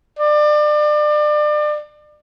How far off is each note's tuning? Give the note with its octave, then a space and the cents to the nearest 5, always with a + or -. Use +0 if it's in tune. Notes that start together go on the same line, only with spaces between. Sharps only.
D5 +30